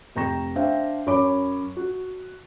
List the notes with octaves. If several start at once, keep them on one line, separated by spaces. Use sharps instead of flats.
F1 G5 A#5 C#6 A#6 E7
D4 C5 E5 F5 G5
F#2 C#4 C#5 B5 D6
F#4